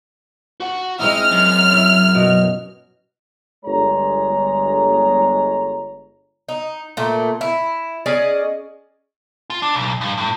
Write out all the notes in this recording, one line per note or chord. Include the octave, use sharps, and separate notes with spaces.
F#4 F#5
G#3 C4 D#4 E4 F6
F#2
E4
B2 F#4
G1 G#3 C#5 A#5
D#4
A#2 A3
E4
C#4 G#4 D5 D#5
F4
D4
B1
G2
A2